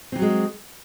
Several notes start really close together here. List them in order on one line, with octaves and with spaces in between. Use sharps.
C4 E3 F#3 G#3